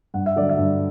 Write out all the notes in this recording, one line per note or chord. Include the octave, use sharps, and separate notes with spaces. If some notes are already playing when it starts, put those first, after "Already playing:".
G2 F#5
E5
D3 F#3 D5
E5
G2